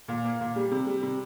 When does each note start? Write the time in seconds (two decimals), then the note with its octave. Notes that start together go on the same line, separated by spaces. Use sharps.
0.08 A#2
0.25 A#3
0.40 A#2
0.56 G3
0.71 C3
0.87 G3
1.03 C3